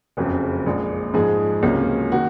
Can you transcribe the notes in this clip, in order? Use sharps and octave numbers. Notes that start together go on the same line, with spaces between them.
F#1 F2 C#3 F#3
A#1 A#2 G#3
G#2 F3 G#3 G#4
C#2 C3 F#3 A#3 C#4
D#3 A#3 F#4